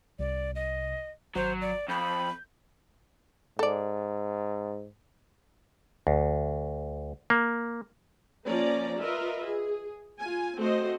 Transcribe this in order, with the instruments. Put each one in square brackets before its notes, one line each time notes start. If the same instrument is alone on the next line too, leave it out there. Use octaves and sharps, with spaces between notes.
[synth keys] C2 C3 [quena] D5
[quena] D#5
[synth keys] G#1 [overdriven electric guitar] F#3 [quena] C5
[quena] D5
[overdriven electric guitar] F2 [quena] B5 [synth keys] G6
[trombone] G#2 [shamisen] A4 D5
[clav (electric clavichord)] D2
A#3
[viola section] F3 A#3 C#4 D5 A#5
F4 A#4 B4 D#5 E5
G#4
F4 G#5
A3 C4 F#4 C5 D#5